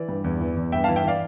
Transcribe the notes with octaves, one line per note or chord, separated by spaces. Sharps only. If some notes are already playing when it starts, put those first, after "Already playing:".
Already playing: E3 D5
G2
E2
E3
E2
G2 E5 G5
E3 F5 A5
E5 G5
E3 D5 F5